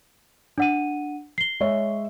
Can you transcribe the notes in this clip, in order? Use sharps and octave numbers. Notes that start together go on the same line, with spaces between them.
D4 F#5 D#7
C7 G7
G#3 C#5 E5